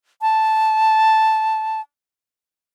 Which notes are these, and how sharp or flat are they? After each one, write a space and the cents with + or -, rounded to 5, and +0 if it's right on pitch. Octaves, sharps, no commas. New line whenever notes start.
A5 -5